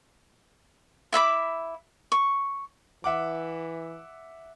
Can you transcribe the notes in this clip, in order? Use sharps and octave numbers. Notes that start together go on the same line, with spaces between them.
E4 E5 B5 D6
C#6
E3 E5 F#5 D6